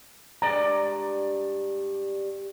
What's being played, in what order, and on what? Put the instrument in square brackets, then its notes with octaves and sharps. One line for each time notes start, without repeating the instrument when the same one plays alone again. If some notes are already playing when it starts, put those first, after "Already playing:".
[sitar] G2 G#3 D5 [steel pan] A#5